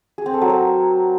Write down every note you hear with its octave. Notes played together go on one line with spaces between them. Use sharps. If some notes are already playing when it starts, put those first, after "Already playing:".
G#4
C4
A4
F#3
A#4